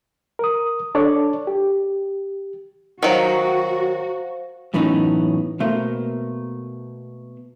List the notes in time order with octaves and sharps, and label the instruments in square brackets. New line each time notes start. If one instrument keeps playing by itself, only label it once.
[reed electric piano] A#4 D#6
D4 A4 C#5 D5
G4
[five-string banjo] D#3 F#3 [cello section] F#4 [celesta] C5 F5
[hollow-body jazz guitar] F#2 A2 E3 B3 C#4 D#4
B2 A3 A#3 C5